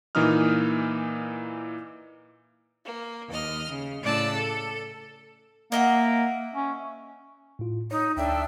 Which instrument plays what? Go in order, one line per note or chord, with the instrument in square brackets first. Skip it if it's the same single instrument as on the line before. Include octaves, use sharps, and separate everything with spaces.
[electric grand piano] A#2 E3 A#3 D#4 D#6 F6
[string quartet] A#3
D#2 D#5 F6
C#3
A2 C#3 D5 A5 E6 F#6
A4
[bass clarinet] A#3 [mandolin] D#5 E5 F#5
[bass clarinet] C#4
[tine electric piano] A2 F4
[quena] D#4 [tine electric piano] C#5
[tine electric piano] D2 [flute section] D4 A4 G5 [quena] E5